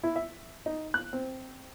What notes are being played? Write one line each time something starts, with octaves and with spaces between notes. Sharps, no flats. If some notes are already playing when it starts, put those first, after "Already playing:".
E4
E5
D#4
F#6
C4